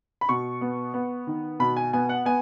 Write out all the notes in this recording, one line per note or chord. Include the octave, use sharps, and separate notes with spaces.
B5
B2 C#6
B3
B3
D#3
B2 B5
G#5
B3 G#5
F#5
B3 G#5